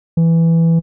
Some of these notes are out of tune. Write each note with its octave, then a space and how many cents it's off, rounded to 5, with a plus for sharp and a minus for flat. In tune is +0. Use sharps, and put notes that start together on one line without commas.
E3 +5